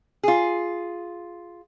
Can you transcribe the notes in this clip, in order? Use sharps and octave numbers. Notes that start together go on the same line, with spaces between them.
F4 G#4